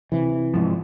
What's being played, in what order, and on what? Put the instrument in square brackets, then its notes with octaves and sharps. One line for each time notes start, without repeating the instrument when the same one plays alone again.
[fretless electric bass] C3 E3
[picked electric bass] G#2 F3